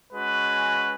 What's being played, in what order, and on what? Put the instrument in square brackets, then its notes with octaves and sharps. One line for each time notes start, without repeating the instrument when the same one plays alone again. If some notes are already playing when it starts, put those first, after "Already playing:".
[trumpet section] G#3 C#4 F#4 B4